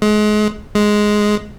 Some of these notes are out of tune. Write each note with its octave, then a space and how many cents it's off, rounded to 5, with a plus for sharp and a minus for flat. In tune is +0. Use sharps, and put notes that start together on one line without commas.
G#3 +30
G#3 +5